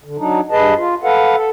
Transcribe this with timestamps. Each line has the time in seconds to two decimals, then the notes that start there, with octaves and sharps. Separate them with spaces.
0.04 D3
0.18 F#3 D4 D#4
0.51 G2 G#4 B4 D#5 A5
0.77 F4
1.04 A4 B4 F5 F#5
1.36 A4